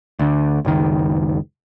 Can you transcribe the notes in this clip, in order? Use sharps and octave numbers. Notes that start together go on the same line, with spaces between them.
D2 D3
F#1 C#2 D#3